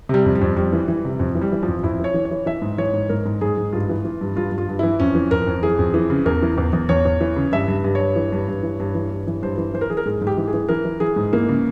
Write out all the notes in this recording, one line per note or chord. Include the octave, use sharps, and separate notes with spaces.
C3 G3
F2
G3
F2
F2 G3
E3
E3
C3
F2
E3
G3
E3
F3
F2
F2 E4
E3 C#5
E3
C#5
E3
E3 E5
G#2
E3 C#5
G#2
G#2 A#4
G#2
G#2 G#4
G#2
G2 F4
E3
E3
G2
G2 F4
G2
F4
G2
E3 E4
F2 C#4
E3
F2 A#4
F2
E3 G#4
F2
E3
C#3
E2 A#4
E3
E2
E2
E2 C#5
E2
E3
C#3
G2 E5
G2
G2
G2 C#5
E3
G2
G2
E3
G2
E3
G2
E3
G2 C5
E3
E3 C5
A#4
E3 G#4
A#4
G#2 G#4
G#2
G4
E3
G#4
E3
E3 A#4
E3
E3 G#4
G#2
E3 A#3
C#3